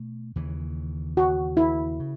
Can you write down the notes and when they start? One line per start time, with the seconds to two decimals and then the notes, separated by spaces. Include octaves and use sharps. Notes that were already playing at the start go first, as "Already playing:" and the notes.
Already playing: B2 A3
0.36 D#2 C#3 E3
1.17 F#4
1.57 E4
2.00 C#3